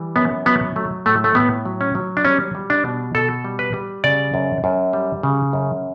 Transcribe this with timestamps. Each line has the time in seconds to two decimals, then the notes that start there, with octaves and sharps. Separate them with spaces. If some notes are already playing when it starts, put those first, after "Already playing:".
Already playing: E3 G3
0.16 F#2 B3
0.46 F#3 B3
0.76 F#3 A3
1.06 A2 A3
1.24 A3
1.35 A2 B3
1.65 F#3
1.81 C#4
1.95 F#3
2.17 D4
2.25 G3 C#4
2.55 G3
2.70 D4
2.85 B2
3.15 B2 A4
3.45 G3
3.59 B4
3.74 G3
4.04 C#3 D5
4.34 F#2
4.64 F#2
4.93 G3
5.23 C#3
5.53 F#2